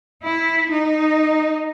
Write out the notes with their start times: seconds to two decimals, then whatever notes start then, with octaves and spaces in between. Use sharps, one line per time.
0.24 E4
0.70 D#4